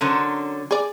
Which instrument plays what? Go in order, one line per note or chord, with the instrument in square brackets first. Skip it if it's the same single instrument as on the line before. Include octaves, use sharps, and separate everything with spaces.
[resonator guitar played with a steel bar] D3 F#3 C#4 [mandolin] A#4 C5 F#5
[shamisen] G#4 D5